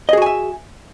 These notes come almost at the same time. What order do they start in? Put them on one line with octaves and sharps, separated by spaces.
D#5 G#4 F#4 G#5 E5